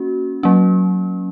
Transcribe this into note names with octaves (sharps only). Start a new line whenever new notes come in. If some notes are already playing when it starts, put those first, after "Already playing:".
Already playing: A#3 C#4 F#4
F#3 A#3 C#4